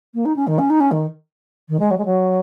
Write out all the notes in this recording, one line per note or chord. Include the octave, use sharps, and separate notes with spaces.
A#3
D#4
C#4
D#3
C#4
D#4
C#4
D#3
D#3
G#3
F#3
G#3
F#3